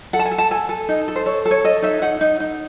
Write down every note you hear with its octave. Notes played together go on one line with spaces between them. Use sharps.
A4 F#5
A5
G#5
A4
A5
A4 G#5
A4
D#4
A4
C5
A4 C#5
A4
C#5
A4 D#5
D#4 E5
D#4 F#5
D#4
D#4